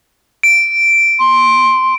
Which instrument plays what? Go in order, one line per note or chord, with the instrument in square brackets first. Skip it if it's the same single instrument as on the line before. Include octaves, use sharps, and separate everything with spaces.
[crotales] D7
[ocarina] C6